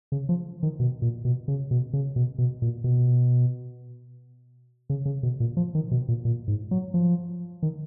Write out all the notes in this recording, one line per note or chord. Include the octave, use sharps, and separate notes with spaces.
C#3
F3
D#3
B2
A#2
B2
C#3
B2
C#3
B2
B2
A#2
B2
C#3
C#3
B2
A#2
F3
D#3
B2
A#2
A#2
G#2
F#3
F3
D#3